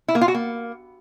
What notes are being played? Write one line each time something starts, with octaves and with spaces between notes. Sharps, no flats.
E4
A#3
F4
F#4
A#3